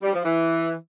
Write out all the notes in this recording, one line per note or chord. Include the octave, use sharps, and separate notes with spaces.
G3
F3
E3